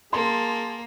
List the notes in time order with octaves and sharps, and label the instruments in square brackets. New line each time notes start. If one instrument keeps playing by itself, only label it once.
[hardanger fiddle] A#3 [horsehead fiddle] G#4 A5 [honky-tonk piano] C6